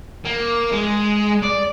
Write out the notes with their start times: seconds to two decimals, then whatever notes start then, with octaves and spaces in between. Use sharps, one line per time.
0.25 A#3
0.73 G#3
1.43 D5